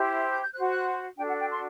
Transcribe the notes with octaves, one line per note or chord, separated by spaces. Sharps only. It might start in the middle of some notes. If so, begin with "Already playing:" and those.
Already playing: E4 G4 C5
G6
G6
F#4 C5 F#6
F#6
D4 F#4 A4 G5
F#5
G5
C6